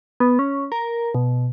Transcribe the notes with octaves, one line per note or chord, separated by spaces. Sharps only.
B3
C#4
A#4
B2